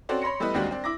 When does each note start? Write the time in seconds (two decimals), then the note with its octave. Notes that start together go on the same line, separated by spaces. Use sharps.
0.09 C4 C#4 F#4 A4 C5 D5
0.22 C#5 B5 C6 A#6 C#7
0.40 G3 A3 B3 E4 B4 D#5
0.54 D#2 G3 G#3 C4 D4 F#4
0.71 C4 D4
0.84 E4 D6 A#6